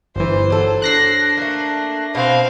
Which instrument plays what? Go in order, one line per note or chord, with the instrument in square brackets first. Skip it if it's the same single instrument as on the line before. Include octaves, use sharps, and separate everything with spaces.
[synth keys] G1 E3 [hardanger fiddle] C5
[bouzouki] F#3 A4
[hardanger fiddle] D4 [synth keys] F#6 A#6 C7
[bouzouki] A3 A#3
[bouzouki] B2 B4 [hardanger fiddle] C4 F5